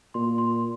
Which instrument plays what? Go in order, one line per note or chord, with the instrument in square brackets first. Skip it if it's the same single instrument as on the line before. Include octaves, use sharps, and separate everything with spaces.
[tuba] A#2 [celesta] C6
[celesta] C6